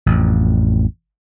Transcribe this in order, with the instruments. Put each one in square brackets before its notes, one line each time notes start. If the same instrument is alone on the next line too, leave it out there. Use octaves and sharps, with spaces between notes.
[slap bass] A1 F2